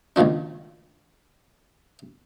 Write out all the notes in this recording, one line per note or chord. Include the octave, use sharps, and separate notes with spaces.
C#2 A#2 D#3 F3 D4